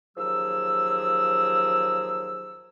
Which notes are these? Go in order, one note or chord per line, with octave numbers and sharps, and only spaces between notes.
D#2 F3 F#3 G#4 E6